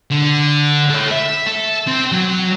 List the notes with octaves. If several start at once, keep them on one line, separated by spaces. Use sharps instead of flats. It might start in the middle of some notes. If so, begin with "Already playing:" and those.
D3
A4 C#5
E5
A4
C4
F#3